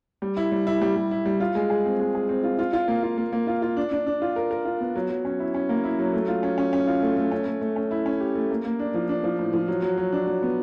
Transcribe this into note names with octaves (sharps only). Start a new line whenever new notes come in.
G3
E4
G3
E4
G3
G3
E4
G3
F4
G#3
G#4
C4
G#3
G#4
C4
F4
F4
F4
A#3
F4
A#3
A#3
F4
F4
D4
D4
D4
F4
A#4
A#4
F4
B3
F#3
F#3
C#4
E4
C#4
A#3
E4
F#3
A3
F4
C#4
C#4
C#4
F4
A3
A3
C#4
A3
A3
C#4
E4
C#4
G4
A3
A#3
A#3
D4
F3
D4
F3
A2
F3
F#3
F#3
F#3
D4
F#3
B3